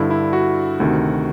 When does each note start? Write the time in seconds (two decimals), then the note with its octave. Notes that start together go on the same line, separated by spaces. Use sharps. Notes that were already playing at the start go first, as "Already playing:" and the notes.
Already playing: G2 D3 E4
0.10 E4
0.33 F#4
0.80 D2 C3 D#3